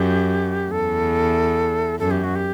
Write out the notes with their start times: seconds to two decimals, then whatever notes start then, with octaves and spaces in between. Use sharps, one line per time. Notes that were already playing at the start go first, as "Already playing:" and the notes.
Already playing: F#2 G4
0.71 E2 A4
2.00 F#2 A4
2.11 G4
2.24 F#4
2.35 G4